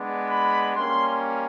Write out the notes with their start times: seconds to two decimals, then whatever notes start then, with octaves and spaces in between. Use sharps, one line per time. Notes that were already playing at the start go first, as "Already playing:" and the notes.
Already playing: G#3 B3 D4
0.30 B5
0.75 G3 A#3 C#4 C6